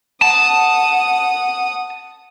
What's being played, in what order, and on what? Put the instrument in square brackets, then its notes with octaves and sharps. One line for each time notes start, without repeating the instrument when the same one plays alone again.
[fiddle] F#5 D#6 [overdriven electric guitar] A5